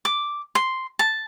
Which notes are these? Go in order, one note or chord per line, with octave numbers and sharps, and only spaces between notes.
D6
C6
A5